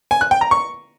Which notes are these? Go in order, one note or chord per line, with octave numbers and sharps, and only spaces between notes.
G#5
F#6
G5
A#5
C#6